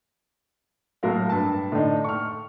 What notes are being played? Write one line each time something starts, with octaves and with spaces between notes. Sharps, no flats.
A2 F#3 A#4 F5
G2 A5
A2 D3 D4 D#4
C#6 F6